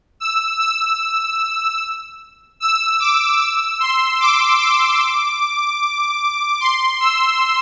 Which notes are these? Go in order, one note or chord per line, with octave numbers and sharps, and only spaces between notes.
E6
E6
E6
D6
E6
C6
D6
D6
C6
E6